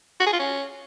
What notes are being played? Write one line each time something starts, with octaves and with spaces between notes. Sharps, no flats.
F#4
G#4
F4
C#4